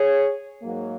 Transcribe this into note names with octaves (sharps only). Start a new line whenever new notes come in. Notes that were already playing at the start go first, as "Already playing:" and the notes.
Already playing: G#4 C#5
G#2 F#3 A#3